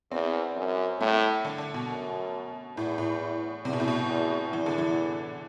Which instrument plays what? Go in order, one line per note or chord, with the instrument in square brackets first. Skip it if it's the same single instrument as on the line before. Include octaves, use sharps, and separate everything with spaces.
[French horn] E2 [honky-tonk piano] C4
[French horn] F#2
[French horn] A2 [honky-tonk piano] A3
[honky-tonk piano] D3
D3
B2
[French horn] F#2
[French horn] E2 [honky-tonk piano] A2
[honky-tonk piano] A2
[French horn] E2 [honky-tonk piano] C3
[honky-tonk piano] B2
A2
B2
[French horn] E2
[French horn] E2 [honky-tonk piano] E3
[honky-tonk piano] D3
E3